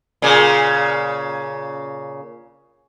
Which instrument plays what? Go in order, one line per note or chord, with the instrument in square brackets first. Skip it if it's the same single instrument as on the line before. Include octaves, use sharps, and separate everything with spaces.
[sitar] A#2 C#3